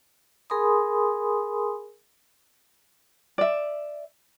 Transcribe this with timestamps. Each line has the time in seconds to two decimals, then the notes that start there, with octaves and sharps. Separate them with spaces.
0.50 G#4 A#4 G#5 B5 C6 D#6
3.38 D5 E5